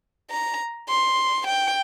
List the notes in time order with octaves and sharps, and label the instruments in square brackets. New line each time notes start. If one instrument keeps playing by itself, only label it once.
[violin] A#5
C6
G5